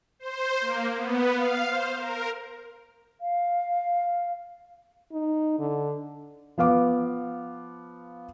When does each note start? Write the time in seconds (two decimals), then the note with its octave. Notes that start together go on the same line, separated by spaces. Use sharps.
0.19 C5
0.61 A#3
0.96 B3
1.33 F5
1.68 C5
1.97 A#4
3.21 F5
5.12 D#4
5.59 D3
6.58 F3 B3 F5 D6